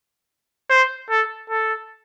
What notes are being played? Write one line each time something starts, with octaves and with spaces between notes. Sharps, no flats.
C5
A4
A4